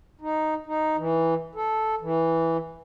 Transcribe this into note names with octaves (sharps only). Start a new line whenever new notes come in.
D#4
D#4
E3
A4
E3